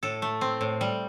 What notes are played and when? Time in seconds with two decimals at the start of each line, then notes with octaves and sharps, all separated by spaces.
0.03 A2 A4
0.22 A3
0.41 C4
0.61 A2
0.81 G3